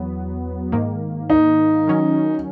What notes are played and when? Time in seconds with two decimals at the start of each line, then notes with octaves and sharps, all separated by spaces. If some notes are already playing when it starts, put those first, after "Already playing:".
Already playing: E2 F#3 B3
0.72 G#2 D#3 A#3
1.30 D#4
1.88 D#3 F#3 C#4